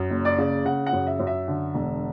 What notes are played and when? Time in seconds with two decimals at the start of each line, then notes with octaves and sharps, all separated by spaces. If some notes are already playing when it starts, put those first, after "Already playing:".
Already playing: F#2
0.10 F#1
0.25 D5
0.38 C#3
0.65 C#3 F#5
0.87 F#5
0.93 F#2
1.07 E5
1.19 F#2
1.27 E5
1.48 D3
1.75 E1